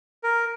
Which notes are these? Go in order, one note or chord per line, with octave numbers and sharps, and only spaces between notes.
A#4